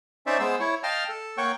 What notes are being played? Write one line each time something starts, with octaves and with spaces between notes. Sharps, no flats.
C#4 D#4 C5 D5 E5
G#3 B3 C5 E6
E4 C#5
D#5 F5 G5 A5 F6
A4
A#3 C#5 F#5 G5 C#6